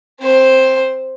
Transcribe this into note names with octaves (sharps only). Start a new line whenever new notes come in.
C4 C5